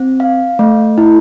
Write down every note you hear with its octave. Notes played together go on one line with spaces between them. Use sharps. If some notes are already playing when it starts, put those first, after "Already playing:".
Already playing: C4
F5
A3
E4